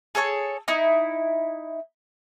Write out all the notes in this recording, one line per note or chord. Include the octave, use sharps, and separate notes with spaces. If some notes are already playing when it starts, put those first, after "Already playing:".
G#4 A4 C#5 A5
D#4 E4